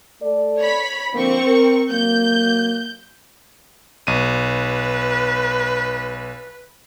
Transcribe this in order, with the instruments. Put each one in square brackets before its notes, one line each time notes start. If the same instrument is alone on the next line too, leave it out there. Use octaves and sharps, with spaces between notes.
[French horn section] A3 A4 D5
[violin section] C#5 B5 B6
[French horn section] D3 F3 A#3 [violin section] C4 C#6
[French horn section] A#4
[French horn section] F#3 A#3 [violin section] G6
[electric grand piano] B1 D#7 [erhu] B4